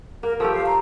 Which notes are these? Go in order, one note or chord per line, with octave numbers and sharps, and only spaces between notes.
A#3 A#4
F3 A3 G4 A4
F5
A#5